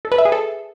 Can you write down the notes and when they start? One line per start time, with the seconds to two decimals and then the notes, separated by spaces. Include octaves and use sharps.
0.05 A4
0.12 B4
0.18 E5
0.25 G#4
0.32 A4